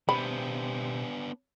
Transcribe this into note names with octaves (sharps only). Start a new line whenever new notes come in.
B2 B3 D4 G4 C5 B5